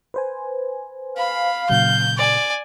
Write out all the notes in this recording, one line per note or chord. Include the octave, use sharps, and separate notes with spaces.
B4 C5 G#5
F5 B5
A#2 C#3 F#3 G6
D5 G#5